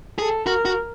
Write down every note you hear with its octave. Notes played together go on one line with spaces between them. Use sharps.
G#4 A4
F#4 A#4
F#4